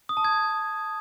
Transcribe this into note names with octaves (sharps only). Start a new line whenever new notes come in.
D#6
A5
G#6